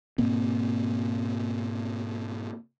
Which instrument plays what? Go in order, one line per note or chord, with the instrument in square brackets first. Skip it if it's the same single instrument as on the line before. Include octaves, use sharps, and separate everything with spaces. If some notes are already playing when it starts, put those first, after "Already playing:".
[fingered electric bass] G#2 B2 A#3 C4